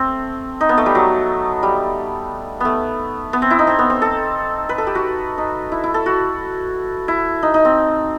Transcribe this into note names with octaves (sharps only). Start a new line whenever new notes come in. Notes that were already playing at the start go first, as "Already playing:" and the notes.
Already playing: A3 C4 A4
D#4
B3
A3
G3
F#3
G3
A3 B3
B3
C4
E4
D#4
C4
B3
C4
A4
B4
A4
G4
F#4
D#4
E4
E4
A4
F#4
E4
D#4
D#4
C4